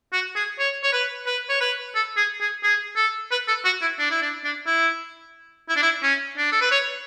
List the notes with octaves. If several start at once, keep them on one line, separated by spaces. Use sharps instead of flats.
F#4
G#4
C#5
C#5
B4
B4
C#5
B4
A4
G#4
G#4
G#4
A4
B4
A4
F#4
E4
D4
E4
D4
D4
E4
E4
D4
E4
C#4
D4
A4
B4
C#5